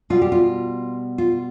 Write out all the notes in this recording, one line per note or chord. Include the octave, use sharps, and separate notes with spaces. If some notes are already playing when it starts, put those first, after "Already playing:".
B2 G3 F4
G4
F4
F4